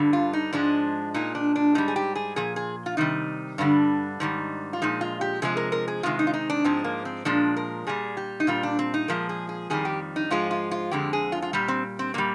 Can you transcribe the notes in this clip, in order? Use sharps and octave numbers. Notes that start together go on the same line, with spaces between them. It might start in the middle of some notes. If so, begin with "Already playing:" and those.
Already playing: G2 D3 G3
F4
D#4
G#2 F3 G#3 D4
A#2 G#3 D#4
D4
D4
G#2 G3 D#4
G#4
G4
G#4
A#2 F3 G#4
G#4
F4
C3 D#3 G3 D#4
G2 D3 G3 D4
G#2 D#3 G3
F4
A#2 F3 G#3 D#4
F4
G4
C3 F3 G#3 G#4
A#4
A#4
G#4
C3 D#3 G#3 F4
D#4
F4
D#4
D4
G#2 F3 G#3 C4
A#3
C4
A#2 F3 G#3 D4
A#4
A#2 G3 G#4
G4
D#4
A#2 G3 F4
D4
C4
D#4
A#2 F3 G#3 A#4
G#4
G#4
F2 D#3 G3 G#4
G4
D#4
G#2 F3 G#3 F4
F4
F4
F2 D3 G#3 G4
G#4
F4
F4
A#2 G3 G4
C4
C4
A#2 G3 A#3